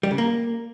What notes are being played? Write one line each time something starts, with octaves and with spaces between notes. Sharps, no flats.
G3
C#3
A#3